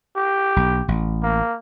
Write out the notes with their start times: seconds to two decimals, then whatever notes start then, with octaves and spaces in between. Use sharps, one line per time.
0.16 G4
0.56 B1
0.88 A1
1.23 A#3